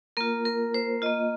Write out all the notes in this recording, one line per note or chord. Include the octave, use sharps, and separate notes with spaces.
A#3 F4 A#4
A#4
C5
A#3 F4 D#5